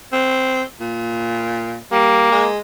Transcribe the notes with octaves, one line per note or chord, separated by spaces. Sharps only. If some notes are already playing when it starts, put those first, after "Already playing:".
C4
A#2
G3 A#3
G#3